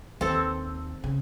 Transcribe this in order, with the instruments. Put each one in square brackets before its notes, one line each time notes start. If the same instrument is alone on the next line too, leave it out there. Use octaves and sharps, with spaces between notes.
[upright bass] D#2 [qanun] C4 A4
[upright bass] C#3